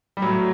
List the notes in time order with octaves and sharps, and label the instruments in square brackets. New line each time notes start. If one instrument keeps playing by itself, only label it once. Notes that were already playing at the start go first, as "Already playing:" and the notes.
[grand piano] G3
[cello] A2 [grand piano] F#3